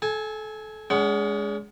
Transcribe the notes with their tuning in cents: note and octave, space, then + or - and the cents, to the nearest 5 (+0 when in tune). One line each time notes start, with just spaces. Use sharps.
A4 -30 G#5 +0
G#3 +0 C#4 +45 F#5 +25